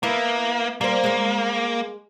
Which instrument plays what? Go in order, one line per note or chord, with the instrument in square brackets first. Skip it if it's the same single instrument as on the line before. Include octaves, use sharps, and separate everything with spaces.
[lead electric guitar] A#3 [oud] B3 E4
[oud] G3 C5 [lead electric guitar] A#3
[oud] G#3 C#5